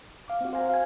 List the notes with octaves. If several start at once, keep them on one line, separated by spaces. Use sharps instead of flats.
F5 D6
C4 F#4
C5 F5 G#5 A#5
F5 G#5